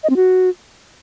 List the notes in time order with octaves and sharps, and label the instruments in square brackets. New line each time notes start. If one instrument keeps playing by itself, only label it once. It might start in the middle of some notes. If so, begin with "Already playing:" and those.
[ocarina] D#5
C4
F#4